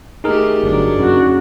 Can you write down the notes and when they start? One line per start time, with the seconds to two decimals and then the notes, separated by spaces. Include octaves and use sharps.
0.24 D#3 A3 D#4 G4 G#4 A#4
0.64 G1 F#3 D4
0.99 F#2 C#3 F#4